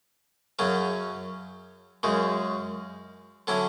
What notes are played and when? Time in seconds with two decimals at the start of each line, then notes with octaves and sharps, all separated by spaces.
0.59 F#2 C#3 F#3 C#4
2.03 F#2 C#3 G#3
3.47 D3 F#3 C#4 E4